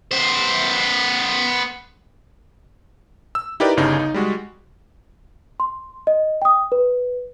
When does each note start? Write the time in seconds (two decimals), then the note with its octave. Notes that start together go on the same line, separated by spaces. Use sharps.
0.11 B3 C5
3.35 E6
3.60 D#4 E4 G4 A#4 B4 D5
3.77 G1 G2 C#3 D#4
3.99 D#4
4.14 G3 G#3 F#4
5.60 C6
6.07 D#5
6.42 G5 D#6
6.72 B4